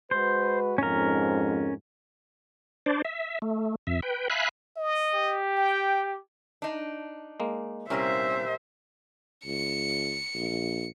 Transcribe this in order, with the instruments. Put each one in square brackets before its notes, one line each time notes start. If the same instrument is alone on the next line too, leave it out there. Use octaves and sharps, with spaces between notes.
[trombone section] G#3 F#4 B4 [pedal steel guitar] C5
[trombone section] F2 G#2 [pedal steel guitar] C#4 A#4
[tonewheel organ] D4 C5 D5
E5
A3
F2 E5
B4 G5
E5 F5 G#5 B5 F#6
[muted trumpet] D#5
[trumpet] G4
[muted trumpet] G5
[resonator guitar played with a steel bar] D4 D#4
[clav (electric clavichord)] G#3 A#3
[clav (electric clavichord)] C2 C#4 A#4 [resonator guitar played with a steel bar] A#2 G3 A#3 [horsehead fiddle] C5 E5
[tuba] C#2 [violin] C#7
[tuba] A#1